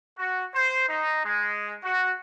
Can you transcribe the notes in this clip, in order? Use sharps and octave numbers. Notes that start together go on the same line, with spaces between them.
F#4
C5
D#4
G#3
F#4